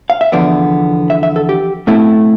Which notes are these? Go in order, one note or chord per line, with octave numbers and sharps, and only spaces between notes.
F5
E5
E2 D3 F3 B3 D5
E5
E5
A4
G4
B2 A3 C4 E4